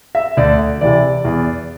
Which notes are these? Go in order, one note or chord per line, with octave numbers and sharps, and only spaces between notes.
E5
D2 D5
C3 E3 D5
E2